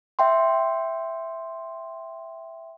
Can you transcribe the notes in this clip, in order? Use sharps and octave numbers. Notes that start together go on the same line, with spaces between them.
E5 G5 C6